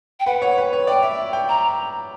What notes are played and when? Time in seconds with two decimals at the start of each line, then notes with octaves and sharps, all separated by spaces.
0.20 G5
0.26 B4 F#5
0.42 C#5
0.58 B4
0.73 C#5
0.87 D5 G5
1.02 E5
1.33 G5
1.49 A#5